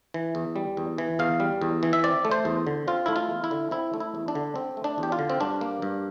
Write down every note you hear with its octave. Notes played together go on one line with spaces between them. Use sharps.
E3
E2
G3
E2
E3
E2 F5
G3
E2
E3
E5
C4 D5
A3
C5
E2
D3
C4 F4
A3 E4
F4
E2
E4
D3
C4 E4
A3
E4
E2
D4
D3
C4
A3
D4
E2
G4
F4
D3
C4
G2 D4
A#3
G2